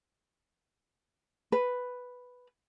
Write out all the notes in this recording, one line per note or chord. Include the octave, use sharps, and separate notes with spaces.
B4